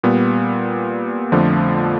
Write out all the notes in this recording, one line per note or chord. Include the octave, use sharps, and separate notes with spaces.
A#2 G3 B3
F2 D3 F3 A3